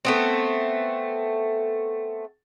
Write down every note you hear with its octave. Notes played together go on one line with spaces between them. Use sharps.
A3 B3 C4